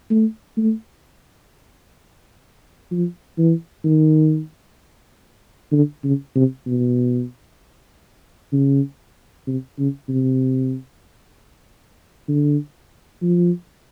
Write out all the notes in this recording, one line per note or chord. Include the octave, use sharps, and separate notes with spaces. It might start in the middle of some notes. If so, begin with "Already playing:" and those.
A3
A3
F3
E3
D#3
D3
C#3
C3
B2
C#3
C3
C#3
C3
D3
F3